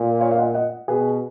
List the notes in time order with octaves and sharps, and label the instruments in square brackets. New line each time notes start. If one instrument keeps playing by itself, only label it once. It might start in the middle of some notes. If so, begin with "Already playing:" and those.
Already playing: [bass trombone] A#2
[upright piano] C#5 F5
F5
D#5 F#5
D#5 F#5
[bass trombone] B2 [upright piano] G#4 B4